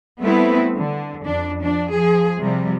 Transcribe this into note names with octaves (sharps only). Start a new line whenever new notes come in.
G3 A3 B3 C4 E4 B4
D3
F2 D4
F3 D4
F3 G#4
C3 F3 G3